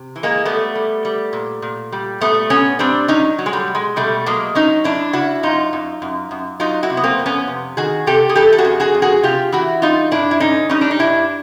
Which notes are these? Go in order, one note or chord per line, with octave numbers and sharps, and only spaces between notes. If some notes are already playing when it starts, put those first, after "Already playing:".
Already playing: C3
E3
G#3 A#3
G3 A3 B3
G3
G3
A#2
A#2
G3
A#2 A3 B3
A#2 B3 C#4
G3 C4 D4
F#3 C#4 D#4
F#3
G#3
G3
B2
G#3
B2 G3 A3
F#3 G#3 A#3
F#3 C#4 D#4
F#2 D4 E4
C#3 E4 F#4
F#2 D#4 F4
F#2
F#2
F#2
F#3 D#4 F4
E4 F#4
C3
B3
A#3 C4
F2
B3 C#4
C3
D#3 F#4 G#4
C3 G4 A4
G#4
E3 G4 A4
A4
F#4 G#4
F2
F#4 G#4
F2
F#4 G#4
C3 F4 G4
E3 E4 F#4
G3 D#4 F4
G2 D4 E4
E4
D3 C#4 D#4
G3 C#4 D#4
D4
D#4
G2 D4 E4